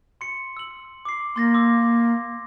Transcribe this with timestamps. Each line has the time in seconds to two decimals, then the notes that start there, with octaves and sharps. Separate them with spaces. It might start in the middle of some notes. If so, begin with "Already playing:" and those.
0.21 C6 C#7
0.57 E6 F#7
1.05 D6 C7
1.36 A#3 C6 A6 A#6
1.54 C6 D6 E6